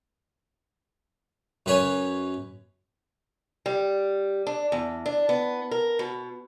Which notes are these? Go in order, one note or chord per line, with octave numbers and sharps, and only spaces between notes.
F#2 B4 C#5 G#5
G3
D4
E2
D4
B3
A#4
B2